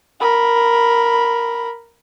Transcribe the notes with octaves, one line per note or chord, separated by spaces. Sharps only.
A#4 B5